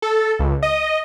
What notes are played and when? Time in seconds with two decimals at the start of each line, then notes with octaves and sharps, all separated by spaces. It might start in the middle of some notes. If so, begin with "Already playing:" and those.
0.02 A4
0.39 C#2
0.63 D#5